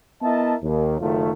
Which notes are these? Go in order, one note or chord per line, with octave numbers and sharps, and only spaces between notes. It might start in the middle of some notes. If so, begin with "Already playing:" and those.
B3 E4 A#4 D#5 E5 A5
D#2
F#1 D#3 A3 F4